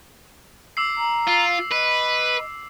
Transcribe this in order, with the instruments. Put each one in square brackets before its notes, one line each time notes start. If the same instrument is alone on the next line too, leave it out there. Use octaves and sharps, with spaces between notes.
[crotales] D6 E6 C7
[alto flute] A#5
[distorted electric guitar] F4
[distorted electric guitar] B4 [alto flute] D#5